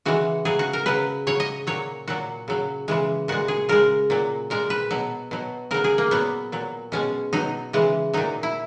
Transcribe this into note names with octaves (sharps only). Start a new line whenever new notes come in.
C#3 E3 G#3 F#4
C#3 F#3 G#4
F#4
A#4
C#3 F#3 B4
C#3 F#3 C#5
D#5
A#2 F#3 C#5
A#2 F#3 F#4
C#3 F#3
C#3 E3 G#3
A#2 G#3 F#4
G#4
C#3 G#3 A#4
A#2 F#3
A#2 G#3 A#4
B4
B2 F#3
B2 F#3
C#3 F#3 A#4
G#4
A#3
A#2 F#3 B3
A#2 F#3
B2 G#3 C#4
B2 F#3 D#4
C#3 E3 G#3
A#2 F#3 D#4
E4